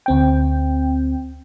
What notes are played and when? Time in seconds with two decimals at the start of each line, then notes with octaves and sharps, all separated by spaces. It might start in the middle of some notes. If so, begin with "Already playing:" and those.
0.06 D2 C4 G5